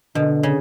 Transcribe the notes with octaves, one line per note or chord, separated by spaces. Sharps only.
B2 D3
C#3